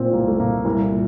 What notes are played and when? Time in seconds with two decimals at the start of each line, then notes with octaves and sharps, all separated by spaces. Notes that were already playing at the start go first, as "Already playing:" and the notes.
Already playing: A#2 C4
0.13 C2 A#3
0.27 A3
0.39 A#2 A#3
0.65 C2
0.92 A#2